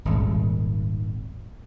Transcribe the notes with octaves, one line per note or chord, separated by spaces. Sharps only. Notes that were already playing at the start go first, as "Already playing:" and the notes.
D#1 G#1